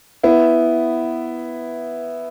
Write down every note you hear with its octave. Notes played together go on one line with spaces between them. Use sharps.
B3 E4